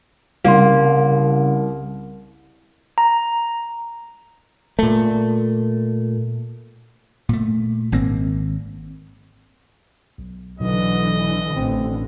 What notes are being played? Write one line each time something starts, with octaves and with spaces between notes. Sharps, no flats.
C2 C#3 A#3 F5 C6
A#5
A#2 A3
A#2 A3
G#1 A#3 C4
B1
B1 D3 E3 D#5
A1 D3 C4